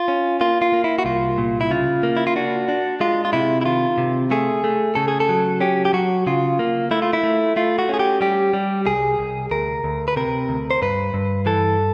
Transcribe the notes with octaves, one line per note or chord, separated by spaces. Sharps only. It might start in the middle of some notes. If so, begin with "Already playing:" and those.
Already playing: F4
C#4
A#3 F4
F4
A#3
E4
F#4
C2 F4
A#2
E4
C#3 F4
A#3
E4
F4
D4 F#4
D4
G#3 F4
F4
C3 E4
E4
D#3 F4
C3
A3 G#4
A3
C#3 A4
G#4
A4
F#3
C#4 G4
G4
F#3 F#4
C#3 F4
A#3
A3 E4
F4
E4
A3
A3 F4
F#4
C#4 G#4
G4
G3 G4
G3
C2 G#4
C2
D2 A#4
D2
B4
C3 A#4
D2
C5
G2 B4
G2
E3 A4